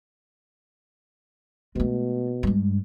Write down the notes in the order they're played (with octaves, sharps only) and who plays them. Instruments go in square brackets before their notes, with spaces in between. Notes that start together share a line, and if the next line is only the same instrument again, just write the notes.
[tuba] B2 [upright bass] G#3 A3
[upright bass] G2 G#3